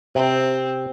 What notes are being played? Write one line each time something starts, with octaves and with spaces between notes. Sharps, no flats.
C3 C4